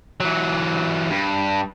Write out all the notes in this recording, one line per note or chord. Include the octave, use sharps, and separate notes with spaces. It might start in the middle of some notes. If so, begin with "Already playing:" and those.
E3 F#3
G2